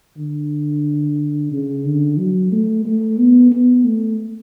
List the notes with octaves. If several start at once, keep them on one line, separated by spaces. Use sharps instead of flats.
D3
C#3
D3
F#3
A3
A3
B3
B3
A3